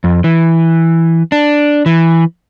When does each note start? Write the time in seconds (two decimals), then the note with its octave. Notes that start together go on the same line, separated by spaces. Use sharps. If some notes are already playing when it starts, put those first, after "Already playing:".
0.04 F2
0.24 E3
1.32 D4
1.86 E3